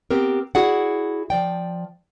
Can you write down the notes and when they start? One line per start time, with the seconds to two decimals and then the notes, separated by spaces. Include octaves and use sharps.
0.11 B3 C4 G4 A#4
0.55 E4 F#4 G#4 D5 F#5
1.30 F3 D5 G5